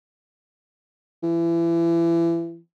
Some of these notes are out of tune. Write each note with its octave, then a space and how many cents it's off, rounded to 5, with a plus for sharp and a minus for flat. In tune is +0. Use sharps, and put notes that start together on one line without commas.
E3 +30